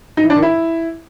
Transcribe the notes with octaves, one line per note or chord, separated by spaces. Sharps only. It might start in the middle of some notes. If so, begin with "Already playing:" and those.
D#4
E3
D4
D#3
E4